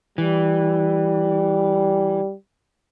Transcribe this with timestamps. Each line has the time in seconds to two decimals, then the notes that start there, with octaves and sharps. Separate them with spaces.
0.18 E3 G3